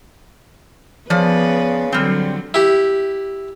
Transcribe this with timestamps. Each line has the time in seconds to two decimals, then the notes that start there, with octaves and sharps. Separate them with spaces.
1.10 C#3 F3 B3 B4 D5
1.92 D3 F#3 G3 C4
2.54 E4 G4